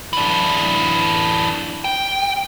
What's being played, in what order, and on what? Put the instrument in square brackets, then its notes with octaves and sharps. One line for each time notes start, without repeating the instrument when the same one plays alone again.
[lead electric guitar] E3 D4
G5